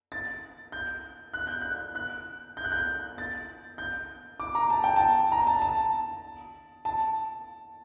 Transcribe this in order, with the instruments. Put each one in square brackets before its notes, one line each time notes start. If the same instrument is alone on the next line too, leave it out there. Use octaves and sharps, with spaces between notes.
[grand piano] A6
G6
F#6
G6
F#6
F#6
G6
F#6
G6
A6
G6
D6
A#5
A5
G5
A5
A#5
A5
A5
A5